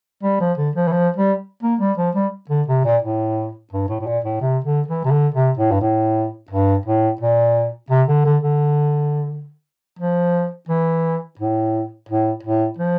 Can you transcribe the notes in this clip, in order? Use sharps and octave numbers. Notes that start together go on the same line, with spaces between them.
G3
F3
D3
F3
E3
F3
G3
A#3
G3
F3
G3
D3
C3
A#2
A2
G2
A2
A2
A#2
A2
C3
D3
E3
C3
D3
C3
A2
G2
A2
G2
A2
A#2
C3
D3
D3
D3
F3
E3
A2
A2
A2
F3